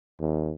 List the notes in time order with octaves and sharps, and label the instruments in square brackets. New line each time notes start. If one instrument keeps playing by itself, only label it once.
[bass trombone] D#2